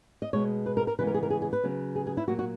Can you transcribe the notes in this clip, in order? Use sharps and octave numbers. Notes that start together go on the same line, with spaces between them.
D#5
B2 G#3 B3 C#5
B4
A#4
A#4
C#3 E3 G#3 B3 B4
A#4
G#4
A#4
G#4
G#4
B4
C#3 F#3 B3
G#4
G#4
E4
A#2 F#3 A#3 F#4
F#4